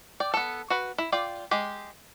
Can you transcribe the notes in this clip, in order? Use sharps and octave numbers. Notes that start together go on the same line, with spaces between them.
D5 G5
B3 A4
F#4 B4
E4
F4 D5 G5
G#3 G4